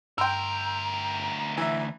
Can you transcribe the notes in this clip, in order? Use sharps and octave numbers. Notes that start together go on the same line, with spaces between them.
D2 G2 A#4 G5 C6 E6
E3 E5